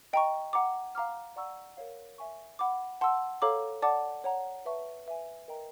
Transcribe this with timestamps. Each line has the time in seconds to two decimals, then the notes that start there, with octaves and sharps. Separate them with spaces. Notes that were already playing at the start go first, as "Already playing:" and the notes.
0.13 D#5 G5 A#5 C#6
0.53 F#5 A#5 D6
0.95 F5 A#5 D6 F6
1.36 D5 F#5 A#5 C#6 E6
1.77 A#4 C#5 F5
2.18 E5 G#5 C#6
2.59 F#5 B5 D6
3.01 F#5 A5 C6 E6
3.42 A4 C#5 F5 A#5 D6
3.82 D5 F#5 A5 D6
4.24 C#5 F#5 A#5
4.65 B4 E5 A5 C#6
5.07 B4 E5 G#5
5.48 A#4 D#5 G5 A#5